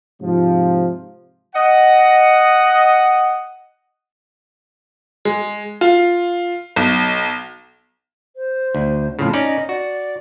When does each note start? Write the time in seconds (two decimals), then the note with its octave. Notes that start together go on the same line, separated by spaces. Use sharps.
0.21 G#2 C3 F3
1.55 D#5 F#5
5.25 G#3
5.81 F4
6.76 B1
8.35 C5
8.75 D2
9.19 F2 A2 C#3 F4
9.33 C#4 D#4 D5 D#5
9.69 F#4 D5